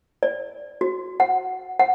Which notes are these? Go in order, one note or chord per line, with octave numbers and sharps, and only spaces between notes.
D5
F#4
F#5
F#5